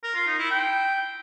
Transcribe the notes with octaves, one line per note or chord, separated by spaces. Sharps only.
A#4
F4
D#4
E4
G5